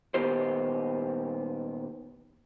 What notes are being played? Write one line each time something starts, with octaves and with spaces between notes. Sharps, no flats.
A#2 D#3 B3 G4 C5